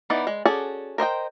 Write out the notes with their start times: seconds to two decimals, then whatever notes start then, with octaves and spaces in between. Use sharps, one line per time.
0.10 E3 B3 D#4 D5
0.27 G#3
0.45 C#4 F#4 G#4 A4 D5
0.98 A#4 C5 D#5 G5